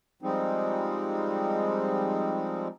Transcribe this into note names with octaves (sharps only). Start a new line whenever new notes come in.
F3 G3 G#3 C4 D#4